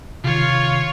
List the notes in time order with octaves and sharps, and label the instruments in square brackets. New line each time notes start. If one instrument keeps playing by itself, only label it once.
[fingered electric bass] C3 D#3 [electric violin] F4 C#5